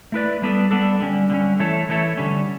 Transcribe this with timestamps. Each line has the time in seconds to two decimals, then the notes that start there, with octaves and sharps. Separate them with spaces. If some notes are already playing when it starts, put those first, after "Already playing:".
0.12 A3 E4 B4 D5
0.42 G3 B3 D4 A4
0.71 G3 B3 D4 A4
1.00 D3 G3 C#4
1.30 D3 G3 C#4
1.59 E3 A3 E4 A4 C#5
1.89 E3 A3 E4 A4 C#5
2.18 D3 G3 C#4